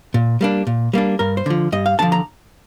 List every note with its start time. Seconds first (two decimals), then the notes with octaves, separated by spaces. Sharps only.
0.14 A#2
0.41 G3 A#3 D4
0.67 A#2
0.93 G3 A#3 D4
1.19 G2 A#4
1.37 C5
1.46 D3 F3
1.72 G2 D#5
1.86 F5
1.99 D3 F3 A5
2.12 A#5